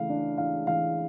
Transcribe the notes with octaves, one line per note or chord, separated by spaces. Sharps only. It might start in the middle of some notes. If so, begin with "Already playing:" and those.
Already playing: C#3 E3 A3 F5
D4
E3 F5
E3 F5